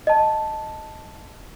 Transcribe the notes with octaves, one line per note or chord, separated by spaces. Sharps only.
D#5 A5